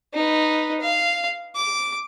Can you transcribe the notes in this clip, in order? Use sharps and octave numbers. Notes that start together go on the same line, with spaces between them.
D#4 B4
F5
D6